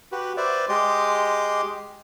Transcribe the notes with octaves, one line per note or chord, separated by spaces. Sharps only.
F#4 G4 B4
B4 C5 D5 E5
G#3 G4 D#5 C6 D6